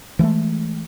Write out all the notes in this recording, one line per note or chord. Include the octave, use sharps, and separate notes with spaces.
E3 F#3 G#3 A3